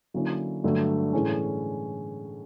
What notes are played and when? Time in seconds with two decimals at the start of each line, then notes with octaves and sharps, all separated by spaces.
0.14 D3 F#3 A#3 C#4 E4
0.64 G2 D3 F#3 A3
1.13 A2 E3 G#3 C#4